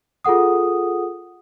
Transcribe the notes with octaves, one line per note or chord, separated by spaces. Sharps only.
F4 G#4 A4 F#5 D#6